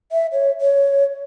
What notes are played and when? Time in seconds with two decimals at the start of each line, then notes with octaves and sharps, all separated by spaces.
0.12 E5
0.32 C#5
0.60 C#5